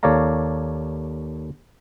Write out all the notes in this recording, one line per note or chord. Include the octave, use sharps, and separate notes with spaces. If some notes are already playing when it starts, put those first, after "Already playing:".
D#2 A4 C#5 D5 F5 A#5